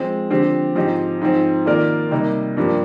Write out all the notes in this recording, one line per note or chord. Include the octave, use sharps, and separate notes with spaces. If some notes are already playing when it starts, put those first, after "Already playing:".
Already playing: F3 G#3 C4
D3 F3 C4 G4
G#2 F3 C4 D#4 G4
G#2 F3 C4
D#3 A#3 F4 A#4 D5
C3 G3 A#3 D#4
G2 F3 A#3 D4 G4